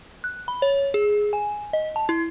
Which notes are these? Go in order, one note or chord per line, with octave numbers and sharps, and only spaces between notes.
F#6
B5
C#5
G#4
G#5
D#5
A5
E4